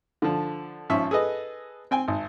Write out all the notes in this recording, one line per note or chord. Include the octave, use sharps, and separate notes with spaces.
D3 F3
G#1 F3 C#4 E5 C#6
G#4 A4 B4 D#5
C4 G5 G#5
G#1